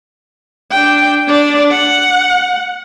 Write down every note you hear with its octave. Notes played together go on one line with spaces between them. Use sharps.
D4 G5
D4 D5
F#5